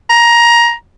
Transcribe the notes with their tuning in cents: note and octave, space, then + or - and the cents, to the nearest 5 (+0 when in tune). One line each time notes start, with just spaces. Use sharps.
A#5 +15